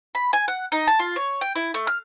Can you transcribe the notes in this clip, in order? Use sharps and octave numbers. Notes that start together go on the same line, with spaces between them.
B5
G#5
F#5
D#4
A5
F4
C#5
G5
E4
A3
F6